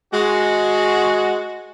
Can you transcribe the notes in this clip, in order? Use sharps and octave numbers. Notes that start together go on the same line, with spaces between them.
G#3 F#4